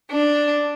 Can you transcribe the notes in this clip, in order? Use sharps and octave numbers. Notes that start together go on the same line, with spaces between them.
D4